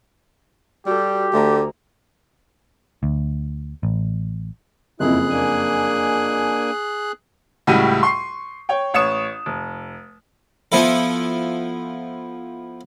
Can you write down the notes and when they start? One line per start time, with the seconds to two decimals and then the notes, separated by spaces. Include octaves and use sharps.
0.86 G3 F#4 G4 A4
1.33 D2 D3 A#5
3.03 D2
3.83 A1
5.00 F#1 F2 E4 G#4 F#6
5.29 A#3 D4 G#5
7.67 C#2 A2 G3 F#4 D#7
8.03 C6 C#6 C7
8.69 C#5 G5
8.94 A1 C#5 D#6 C#7 E7
9.46 F1
10.72 F3 B3 E4 A4